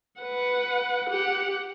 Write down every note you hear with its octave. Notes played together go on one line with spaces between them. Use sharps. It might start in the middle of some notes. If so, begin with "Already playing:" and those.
B4 F#5
G4 F#5